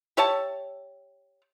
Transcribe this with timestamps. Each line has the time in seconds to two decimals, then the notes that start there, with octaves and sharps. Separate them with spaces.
0.17 G4 C#5 E5 A5